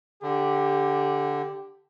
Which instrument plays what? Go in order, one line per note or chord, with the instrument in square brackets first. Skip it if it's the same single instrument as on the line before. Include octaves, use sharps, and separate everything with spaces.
[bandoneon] D3 [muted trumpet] G4